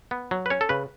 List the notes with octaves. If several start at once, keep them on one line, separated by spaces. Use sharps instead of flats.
B3
F#3
B4
C#4 C#5
A4
C#3 B4